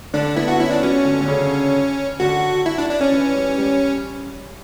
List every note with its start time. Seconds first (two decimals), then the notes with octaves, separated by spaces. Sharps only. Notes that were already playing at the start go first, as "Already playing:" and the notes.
0.14 D3 D4
0.36 B3 E4
0.48 F#4
0.60 C#4 E4
0.71 D4
0.83 F#3 C#4
1.05 D3
1.21 D3
1.28 C#3
2.20 D3 F#4
2.66 E4
2.78 D4
2.89 D4
3.01 C#4
3.12 E3
3.36 G3
3.58 G3